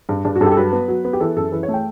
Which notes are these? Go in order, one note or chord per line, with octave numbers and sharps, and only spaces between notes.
G2
G2 D4
F#4
G2 A4
G4
A4
F#3 B4
B3
F#3
B3
G4
E3 A4
F#2 A4
E3 B4
C#5
A3
G5